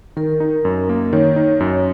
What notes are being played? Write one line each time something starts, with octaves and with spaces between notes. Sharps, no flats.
D#3 A#4
D#4
F#2
A#3
D#3 C#5
D#4
F#2